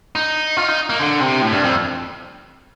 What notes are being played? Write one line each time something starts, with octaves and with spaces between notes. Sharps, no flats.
D#4
F4
D#4
A#3
D3
C3
A2
G2
F2